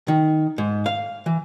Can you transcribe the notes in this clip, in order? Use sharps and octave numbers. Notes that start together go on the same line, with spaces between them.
D#3
G#2
F5
E3